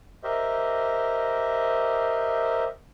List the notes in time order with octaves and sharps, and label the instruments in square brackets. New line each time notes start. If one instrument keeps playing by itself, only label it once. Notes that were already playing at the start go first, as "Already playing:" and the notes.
[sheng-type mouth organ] G4 A#4 C5 D#5 E5